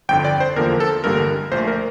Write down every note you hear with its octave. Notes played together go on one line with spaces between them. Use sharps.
G1 F2 D3 G5
D5
C5
E2 D3 F3 A#3 A#4
A4
A1 G2 D3 G3 A#3 A#4
A#1 A#2 A3 C5
A#4